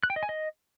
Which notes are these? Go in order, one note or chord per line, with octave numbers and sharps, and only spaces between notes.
F#6
G5
D#5
G#5
D#5